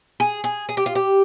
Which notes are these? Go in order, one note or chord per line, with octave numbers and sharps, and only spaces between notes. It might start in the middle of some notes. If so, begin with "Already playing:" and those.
G#4
G#4
G#4
G4
F4
G4